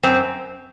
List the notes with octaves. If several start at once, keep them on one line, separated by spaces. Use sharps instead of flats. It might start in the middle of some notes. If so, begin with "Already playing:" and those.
F#2 C4